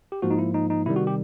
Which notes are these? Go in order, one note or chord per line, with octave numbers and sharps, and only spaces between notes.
G4
G#2 F3 A#3 F#4
D#4
E4
D#4
D#4
C3 D#3 G3 E4
F#4
G4